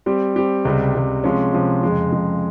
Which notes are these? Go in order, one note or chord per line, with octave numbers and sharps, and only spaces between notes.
G3 C4 G4
G3 C4 G4
C#2 C3 G3
C#2 C3 G3
C3 F3 G#3 C#4
C3 F3 G#3 C#4
F2 C#3 G#3
F2 C#3 G#3